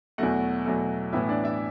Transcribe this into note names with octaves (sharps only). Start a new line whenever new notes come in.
E2 B2 F#3 A3 F#4 F#5
E2 B2 F#3 A3
A1 A2 E3 B3 E4 E5
D4 D5
E4 E5